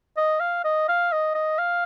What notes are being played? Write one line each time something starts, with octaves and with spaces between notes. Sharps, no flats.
D#5
F5
D#5
F5
D#5
D#5
F5